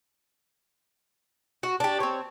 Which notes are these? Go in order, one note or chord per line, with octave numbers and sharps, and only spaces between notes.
F#4
D4 G4
C4 C#5